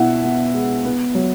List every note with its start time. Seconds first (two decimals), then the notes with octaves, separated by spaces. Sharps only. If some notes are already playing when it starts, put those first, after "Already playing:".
Already playing: B2 B3 E4 E5 F#5
0.24 B3
0.53 G#3
0.85 B3
1.15 F#3